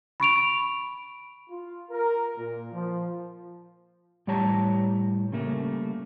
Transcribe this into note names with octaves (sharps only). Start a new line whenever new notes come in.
B5 C#6 D7 F7
F4
A#4
A#2
F3
A2 G3 G4 C#5 A5 A#5
C#3 G3 A3 A#3